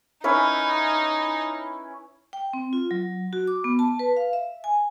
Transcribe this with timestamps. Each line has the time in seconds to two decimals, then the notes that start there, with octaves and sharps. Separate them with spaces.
0.24 C#4 D#4 E4 B4
2.33 G5
2.53 C4
2.73 F4
2.91 F#3
3.33 F#4
3.47 D6
3.64 B3
3.79 A5
3.99 B4
4.16 F5
4.33 E5
4.64 G#5